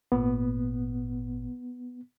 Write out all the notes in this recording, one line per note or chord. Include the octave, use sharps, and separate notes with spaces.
G#1 A#2 B3